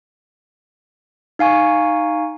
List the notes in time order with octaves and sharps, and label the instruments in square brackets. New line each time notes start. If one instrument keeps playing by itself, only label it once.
[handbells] D#4 F5 G#5 C#6